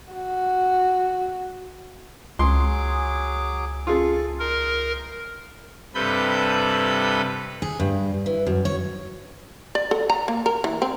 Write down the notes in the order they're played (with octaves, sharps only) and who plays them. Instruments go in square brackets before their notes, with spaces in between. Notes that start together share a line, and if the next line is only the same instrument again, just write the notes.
[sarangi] F#4
[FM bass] C#2 [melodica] F#3 G#4 D6 [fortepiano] C6
[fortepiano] F4 G#4 [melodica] A4
[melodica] D#4 C6 [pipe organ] A#4
[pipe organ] G2 C3 A4 B4 B5 G6
[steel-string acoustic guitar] G#4
G2
E3
F#2
C#5
[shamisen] D5
A4
A#5
A#3
A#4
E3
C4